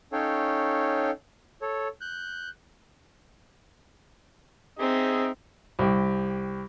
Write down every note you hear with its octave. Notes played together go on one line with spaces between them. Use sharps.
C#4 D#4 A4 C#5 F5 G5
A4 C#5
F#6 G6
C4 D#4 G#4 E5
C2 G4